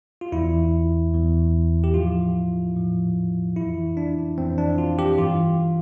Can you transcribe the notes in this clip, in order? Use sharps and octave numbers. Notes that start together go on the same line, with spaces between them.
F4
E2 E3 E4
E2 E3
G4
A2 F3 F4
A2 F3
F2 E3 E4
D4
F2 E3 C4
D4
F4
G4
G2 E3 F4